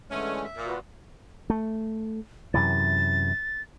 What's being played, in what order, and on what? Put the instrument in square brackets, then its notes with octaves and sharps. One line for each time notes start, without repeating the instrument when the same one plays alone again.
[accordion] D3 E3 G#3 [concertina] A3 [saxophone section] C#4
[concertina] E5
[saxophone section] A#2
[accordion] F4 F#4 B4
[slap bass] A3
[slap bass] F#2 C3 E3 [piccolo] A6